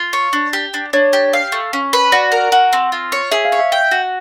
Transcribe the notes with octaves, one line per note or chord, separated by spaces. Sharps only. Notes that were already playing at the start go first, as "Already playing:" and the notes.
Already playing: F4
C#5
D4
G4
D4
D4 C#5
G4
F5
A3
C#4
B4
F#4 D5
A#4
F#4
C4
F4
C#5
G#4 E5
F5
C#5
E5
G5
F#4